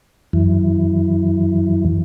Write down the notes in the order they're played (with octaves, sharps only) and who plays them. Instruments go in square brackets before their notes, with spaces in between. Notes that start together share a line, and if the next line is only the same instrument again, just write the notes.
[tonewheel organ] F#2 E3